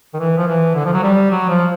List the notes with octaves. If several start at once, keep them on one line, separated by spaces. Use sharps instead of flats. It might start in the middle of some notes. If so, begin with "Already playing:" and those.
D#3
E3
F3
E3
D3
F3
F#3
G3
F#3
F3